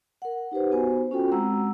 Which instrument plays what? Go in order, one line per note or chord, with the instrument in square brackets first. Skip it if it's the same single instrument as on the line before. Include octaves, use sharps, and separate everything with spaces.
[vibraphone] A#4 F#5
D#4 G4 B4 C5
B3 F#4 C5 G#5
C#4 F4 F#4 A4 G5
G#3 C4 F#5 A#5 E6